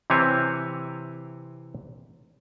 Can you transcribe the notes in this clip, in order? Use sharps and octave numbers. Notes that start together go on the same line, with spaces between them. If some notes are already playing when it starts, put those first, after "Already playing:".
C3 E3 C4 G4 C#5 G#5